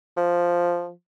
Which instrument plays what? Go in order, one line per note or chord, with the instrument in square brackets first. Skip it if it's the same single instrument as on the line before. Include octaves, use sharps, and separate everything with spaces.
[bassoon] F3